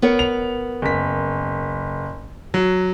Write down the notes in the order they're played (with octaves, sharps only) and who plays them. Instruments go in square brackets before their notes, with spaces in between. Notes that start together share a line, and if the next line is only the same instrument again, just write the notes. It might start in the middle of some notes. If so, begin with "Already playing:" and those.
[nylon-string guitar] B3 A#4 C#5
[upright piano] F7
F#1 B6
F#3